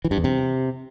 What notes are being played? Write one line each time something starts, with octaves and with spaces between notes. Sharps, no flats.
E3
G2
E2
C3